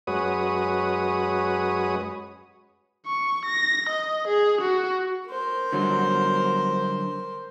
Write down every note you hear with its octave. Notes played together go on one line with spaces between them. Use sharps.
F#2 G#3 F#4 B4 C#5 D#6
C#6
A#6
D#5
G#4
F#4
A#4 C5
D3 F#3 G3